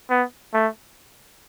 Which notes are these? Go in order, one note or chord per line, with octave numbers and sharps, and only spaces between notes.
B3
A3